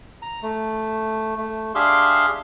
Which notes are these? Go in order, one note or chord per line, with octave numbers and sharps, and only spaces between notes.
A#5
A3
A3
D4 G4 G#4 E5 F5 C6